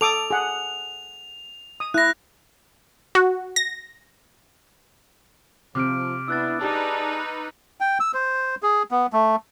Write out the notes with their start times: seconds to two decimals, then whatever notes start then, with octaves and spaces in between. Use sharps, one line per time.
0.01 A4 D6 D#6 F7
0.30 G#4 F#5
1.80 D#6
1.94 E4 F#6 A#6
3.15 F#4
3.56 A#6
5.75 C3 F3 D6 F6 D7
6.28 B3 D4 E4 E6 F#6 A6
6.61 D#4 G4 G#4 B4 D5 A5
7.81 G5
8.00 E6
8.14 C5
8.63 G#4
8.91 B3
9.13 A3